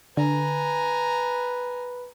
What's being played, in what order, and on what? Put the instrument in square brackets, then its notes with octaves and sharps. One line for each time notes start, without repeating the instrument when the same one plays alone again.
[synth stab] D3 [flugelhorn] B4 [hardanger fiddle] G#5 A#5